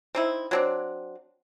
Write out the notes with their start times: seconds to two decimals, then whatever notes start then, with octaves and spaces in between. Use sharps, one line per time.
0.15 C4 D#4 E4
0.51 F#3 C4 D4